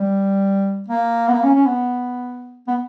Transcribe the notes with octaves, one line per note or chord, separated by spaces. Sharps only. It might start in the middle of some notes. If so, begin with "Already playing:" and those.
Already playing: G3
A#3
B3
A#3
C#4
C#4
B3
B3